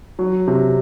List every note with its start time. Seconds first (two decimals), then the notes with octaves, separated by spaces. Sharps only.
0.19 F#3
0.47 C3